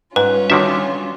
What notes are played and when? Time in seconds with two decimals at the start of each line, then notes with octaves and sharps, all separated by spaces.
0.16 G#2 G3 C#4 F4 B4
0.50 D3 D#3 D4 F#4 C#5 E5